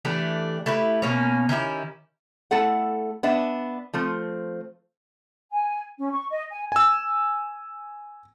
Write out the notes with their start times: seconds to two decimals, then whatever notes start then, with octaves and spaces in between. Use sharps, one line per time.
0.05 E3 A3 D4 G4
0.66 A3 E4 G4 B4
1.02 B2 A#3 C#4
1.49 D#3 C#4 E4 G4
2.51 A3 E4 A4 F#5
3.23 B3 D4 E5
3.93 F3 A3 C4
5.52 G#5
5.98 C#4
6.12 C#6
6.30 D#5
6.51 G#5
6.72 G#5 E6